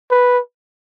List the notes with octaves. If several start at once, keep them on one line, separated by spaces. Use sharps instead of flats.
B4